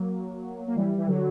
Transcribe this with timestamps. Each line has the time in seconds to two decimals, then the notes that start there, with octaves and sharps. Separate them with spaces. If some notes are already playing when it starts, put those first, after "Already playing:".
Already playing: F#3 A#3
0.67 A#3
0.76 E3 G3
0.98 E3
1.07 D3 F#3